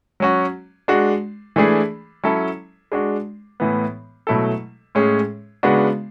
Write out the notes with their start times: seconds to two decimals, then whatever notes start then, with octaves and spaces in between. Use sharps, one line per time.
0.20 F#3 C#4 F#4
0.88 G#3 D4 F#4
1.56 E3 A3 D4 G#4
2.24 F#3 C#4 E4 A4
2.92 G#3 D4 F#4
3.60 A2 E3 B3
4.27 B2 F#3 A3 E4 A4
4.95 A2 G#3 C#4 G#4
5.63 C#3 G#3 B3 D4 F#4